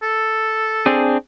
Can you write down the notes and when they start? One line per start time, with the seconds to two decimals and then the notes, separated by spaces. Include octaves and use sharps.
0.03 A4
0.86 C4 D4 G#4